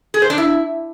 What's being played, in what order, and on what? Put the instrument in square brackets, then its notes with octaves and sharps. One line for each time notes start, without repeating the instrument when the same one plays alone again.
[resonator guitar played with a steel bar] G#4
C5
D4
E4